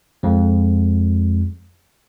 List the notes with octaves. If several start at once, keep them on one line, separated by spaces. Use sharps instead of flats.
F2 G#3